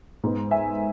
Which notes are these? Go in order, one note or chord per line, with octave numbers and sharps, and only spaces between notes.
G#2 G#3 B3
E5 G#5